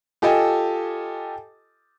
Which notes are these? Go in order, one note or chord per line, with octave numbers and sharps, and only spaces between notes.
F4 G4 A4 D#5 G#5 A5